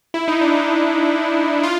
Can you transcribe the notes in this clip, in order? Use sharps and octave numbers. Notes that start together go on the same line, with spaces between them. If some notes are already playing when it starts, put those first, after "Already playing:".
E4
D#4
D4
D#4
F4